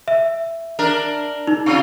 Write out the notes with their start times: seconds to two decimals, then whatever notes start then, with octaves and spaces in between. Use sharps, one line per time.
0.08 E5
0.79 D4 A#4
1.47 D#4
1.66 C3 F4